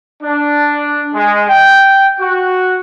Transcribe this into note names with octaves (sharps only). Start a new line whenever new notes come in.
D4
G#3
G5
F#4